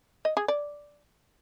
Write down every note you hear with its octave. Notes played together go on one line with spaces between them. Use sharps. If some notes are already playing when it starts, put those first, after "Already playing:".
D#5
G#4
D5